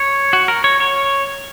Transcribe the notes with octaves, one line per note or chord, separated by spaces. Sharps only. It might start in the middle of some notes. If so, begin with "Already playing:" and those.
Already playing: C#5
F#4
A#4
C#5
C#5